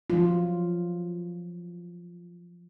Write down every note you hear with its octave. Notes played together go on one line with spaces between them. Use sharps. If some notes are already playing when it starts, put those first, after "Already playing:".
F3 F#3 F4